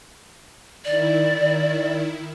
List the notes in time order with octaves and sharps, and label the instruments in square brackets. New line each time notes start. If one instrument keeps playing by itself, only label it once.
[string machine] D#3 E4 [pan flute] D5